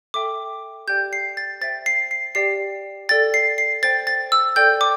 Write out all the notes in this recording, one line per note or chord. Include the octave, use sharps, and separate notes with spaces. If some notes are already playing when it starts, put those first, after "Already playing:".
A4 E5 G5 D6
G4 D5 G5 G6
C7
A6
C5 E5 G5 A6
C7
C7
G4 D5 G5 C7
A4 D5 G5 A6
C7
C7
C5 G5 A6
A6
E6
A4 D5 G5 G6
D6